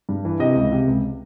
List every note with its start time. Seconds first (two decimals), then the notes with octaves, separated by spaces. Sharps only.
0.09 G2
0.25 E3
0.40 C3 D#5
0.55 C#2
0.72 C3
0.87 C#2